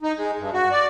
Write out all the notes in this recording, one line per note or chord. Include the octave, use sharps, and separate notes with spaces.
D#4
G#3
G2
F#4
D5